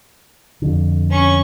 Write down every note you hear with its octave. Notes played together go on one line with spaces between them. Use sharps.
F2 D3
C#4 C#6